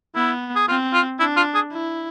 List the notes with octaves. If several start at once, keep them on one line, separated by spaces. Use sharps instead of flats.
B3 E4
G#4
C4 F4
F4
D4 E4
F4
G#4
E4